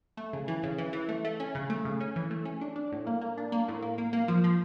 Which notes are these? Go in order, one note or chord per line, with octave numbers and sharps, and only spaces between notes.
A3
C#3
E3
C#3
E3
E3
A3
A3
C#4
C#3
A3
C#3
C#4
E3
A3
C#4
D4
D4
A2
A#3
A#3
D4
A#3
A2
A#3
A#3
A#3
F3
F3